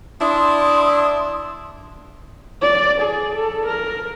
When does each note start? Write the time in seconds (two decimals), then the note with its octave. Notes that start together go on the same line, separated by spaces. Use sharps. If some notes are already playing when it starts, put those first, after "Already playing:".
0.21 D4 E4 C6 D#6
2.62 D5
3.01 G#4
3.35 A4
3.66 A#4